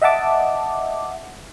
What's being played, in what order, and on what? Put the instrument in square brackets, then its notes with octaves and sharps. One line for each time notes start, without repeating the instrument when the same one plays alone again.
[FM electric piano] D#5 E5 F#5 A5 D6